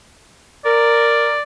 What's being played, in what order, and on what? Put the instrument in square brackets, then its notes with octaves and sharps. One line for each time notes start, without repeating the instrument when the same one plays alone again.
[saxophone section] A#4 [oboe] D5